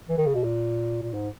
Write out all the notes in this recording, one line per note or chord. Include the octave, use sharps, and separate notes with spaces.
E3
D#3
C#3
B2
A#2
A#2
G#2